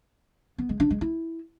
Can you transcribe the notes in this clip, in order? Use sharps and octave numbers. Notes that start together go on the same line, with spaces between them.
B3
G#3
D4
G#3
E4